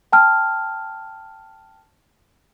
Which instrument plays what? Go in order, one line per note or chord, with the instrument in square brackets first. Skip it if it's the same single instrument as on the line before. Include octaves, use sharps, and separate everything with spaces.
[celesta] G5 A5 F6